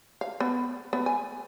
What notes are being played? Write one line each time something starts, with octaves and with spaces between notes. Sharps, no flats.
F5
B3
B3
G#5